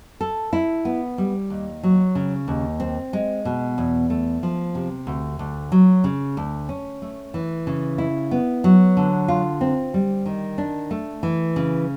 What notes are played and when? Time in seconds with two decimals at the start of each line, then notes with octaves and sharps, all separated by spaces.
0.21 A4
0.53 E4
0.85 B3
1.18 G3
1.50 D#2
1.83 F#3
2.15 C#3
2.48 D#2
2.80 C4
3.13 G#3
3.45 B2
3.78 E2
4.10 A3
4.43 F3
4.75 C3
5.07 D2
5.39 D2
5.72 F#3
6.04 C#3
6.37 D2
6.69 C#4
7.02 A3
7.34 E3
7.67 C#3
7.98 E4
8.31 B3
8.64 F#3
8.97 D3
9.28 F4
9.61 C4
9.94 G3
10.26 D#3
10.58 D4
10.91 A3
11.23 E3
11.56 C#3